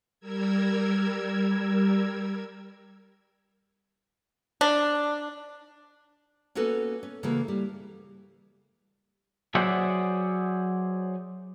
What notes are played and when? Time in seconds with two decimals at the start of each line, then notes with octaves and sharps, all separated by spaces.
0.20 G3 A#4 E6 G#6
4.61 D4
6.55 A#3 B3 C#4 F#4 A4 B4
7.03 C#4
7.23 C#3 E3 A3 A#3 F#4
7.48 G3
9.55 F#3 G#4 C5 D5 E5 F#5